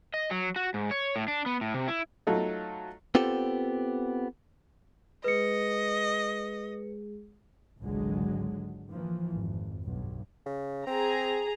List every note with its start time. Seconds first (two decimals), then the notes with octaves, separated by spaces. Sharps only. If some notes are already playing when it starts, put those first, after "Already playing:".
0.14 D#5
0.31 F#3
0.56 F#4
0.74 G#2
0.91 C#5
1.16 A2
1.28 D4
1.46 B3
1.61 A2
1.74 C3
1.88 E4
2.27 F#3 A3 D#4 F4 A4
3.15 B3 C4 F4 G4 A4 C5
5.24 G#3 G#4 B4 D#5 C#7
7.79 G#1 C#2 D3 F#3 G#3
8.89 E3 F3 A#3
9.31 G#1 F2
9.85 B1 G2
10.46 C#3
10.87 C4 G#4 A#5